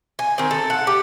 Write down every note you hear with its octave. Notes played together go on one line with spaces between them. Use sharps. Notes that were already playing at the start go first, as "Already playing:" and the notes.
G#5
D#3 C4
A4
F#5
G4